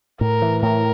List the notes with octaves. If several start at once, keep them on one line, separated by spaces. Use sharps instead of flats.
A2 A#4
E3
A2 A#4